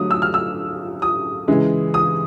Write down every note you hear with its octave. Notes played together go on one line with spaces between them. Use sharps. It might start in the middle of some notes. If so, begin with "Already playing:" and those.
Already playing: D3 F#3 A3 D#6
E6
F6
E6
D#6
C#3 E3 G#3
D#6